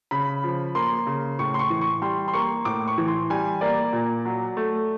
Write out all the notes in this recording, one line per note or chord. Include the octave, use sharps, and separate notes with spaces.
C#3 B5
F3
A#3 C6
C#3
A2 C#6
C6
C#6
E3
C#6
G3 C6
C6
A#3 C#6
A2 D6
C#6
E3
C6
G3 G#5
A#3 D5
A#2
F#3
A3